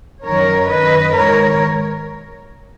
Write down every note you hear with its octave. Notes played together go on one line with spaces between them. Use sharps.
F#2 D#3 A#4 C#5
F#2 D#3 B4 D#5
G#2 D#3 A#4 C#5